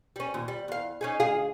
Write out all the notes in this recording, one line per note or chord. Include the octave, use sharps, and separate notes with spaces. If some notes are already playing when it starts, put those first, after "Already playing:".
G3 C#4
D#2 A#2
G3
E2 F5
C#4 D#4 G#4
D2 G#4 F5